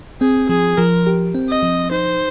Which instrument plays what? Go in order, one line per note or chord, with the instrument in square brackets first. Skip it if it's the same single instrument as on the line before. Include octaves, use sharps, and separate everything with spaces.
[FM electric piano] C4 [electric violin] G#4
[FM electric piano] F3 [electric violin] G#4
[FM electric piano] F3 [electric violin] A#4
[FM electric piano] G4
C4
[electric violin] D#5
[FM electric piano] F3
[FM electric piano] D#4 [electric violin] C5